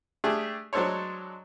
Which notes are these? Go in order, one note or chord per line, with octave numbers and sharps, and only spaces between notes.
A3 D4 G4 G#4
F#3 G#3 D4 A4 C5 C#5